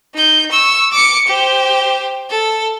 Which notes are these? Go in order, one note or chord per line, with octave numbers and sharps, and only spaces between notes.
D#4 G6
C#6 E6
D6 C#7
G4 C5
A4